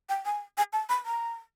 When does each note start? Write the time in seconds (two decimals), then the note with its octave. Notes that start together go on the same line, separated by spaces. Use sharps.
0.09 G5
0.25 G#5
0.58 G#5
0.73 A5
0.89 B5
1.06 A#5